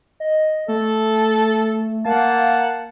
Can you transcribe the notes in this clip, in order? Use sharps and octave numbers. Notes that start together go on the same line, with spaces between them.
D#5
A3 A4
A#3 F5 F#5 A5